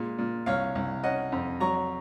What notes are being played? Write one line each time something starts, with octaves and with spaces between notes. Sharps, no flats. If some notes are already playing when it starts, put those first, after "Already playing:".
Already playing: A#2 G#3
A#2
C2 C#5 F5
C2
C#4 D#5 F#5
F2
F#3 A#5 C#6